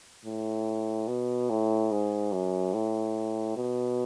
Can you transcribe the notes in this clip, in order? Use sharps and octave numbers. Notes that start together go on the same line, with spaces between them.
A2
B2
A2
G#2
F#2
A2
B2